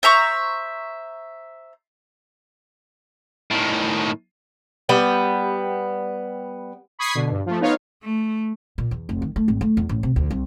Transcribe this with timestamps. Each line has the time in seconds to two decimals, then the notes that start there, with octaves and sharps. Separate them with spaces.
0.03 C5 E5 A#5 C#6
3.51 A2 D#3
4.89 G3 B3 G5
6.99 B5 C#6 D#6 G#6 B6 C7
7.15 B2 D3
7.31 G2
7.46 F3 A3
7.60 B3 D#4 F4 C#5 F5
8.03 A3
8.78 A#2
8.91 E2
9.09 F1
9.22 D#3
9.36 A3
9.48 G#1
9.61 A3
9.77 E2
9.89 A1
10.03 C3
10.16 D2
10.31 C2